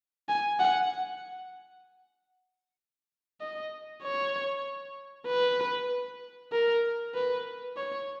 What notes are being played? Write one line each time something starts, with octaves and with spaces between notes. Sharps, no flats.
G#5
F#5
D#5
C#5
B4
A#4
B4
C#5